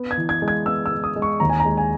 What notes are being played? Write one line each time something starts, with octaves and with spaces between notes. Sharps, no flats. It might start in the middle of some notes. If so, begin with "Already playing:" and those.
Already playing: B3
G#6
E3
G#6
G#3
G#6
B3 E6
E6
G#3
D#6
G#3
C#6
D#2 A#5
G#5
A#5
G#3
G#5